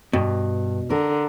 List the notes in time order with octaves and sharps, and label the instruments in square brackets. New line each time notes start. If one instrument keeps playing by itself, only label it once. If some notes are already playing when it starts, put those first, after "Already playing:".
[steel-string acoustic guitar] G2 [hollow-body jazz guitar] B2
[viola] D3 [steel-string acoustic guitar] A#4